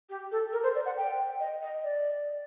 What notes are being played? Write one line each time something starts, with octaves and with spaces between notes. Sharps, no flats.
G4
A4
A#4
C5
D5
F#5
G5
D#5
D#5
D5